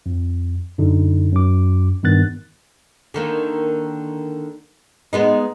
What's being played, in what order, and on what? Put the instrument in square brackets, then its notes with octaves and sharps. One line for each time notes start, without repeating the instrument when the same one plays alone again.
[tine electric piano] F2
F#2 D3 D#4
F#2 D6
G2 D#3 B3 F#6 A6
[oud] D3 D#3 A#3
G#3 B3 D#4